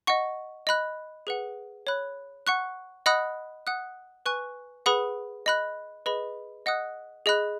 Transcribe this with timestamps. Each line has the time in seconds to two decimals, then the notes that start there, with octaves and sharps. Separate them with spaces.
0.07 D#5 F#5 C#6
0.67 D#5 B5 F#6
1.27 G#4 B4 F#5
1.87 C#5 B5 F#6
2.47 F#5 C#6 F#6
3.06 D#5 F#5 B5 D#6 F#6
3.67 F#5 D#6 F#6
4.26 B4 G#5 C#6 F#6
4.86 G#4 B4 F#5 B5 D#6
5.46 D#5 B5 F#6
6.06 G#4 B4 D#5 B5
6.66 D#5 F#5 D#6 F#6
7.26 G#4 D#5 B5 F#6